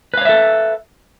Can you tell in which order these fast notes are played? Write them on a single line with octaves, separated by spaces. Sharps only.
B4 F5 C#5 E5 A4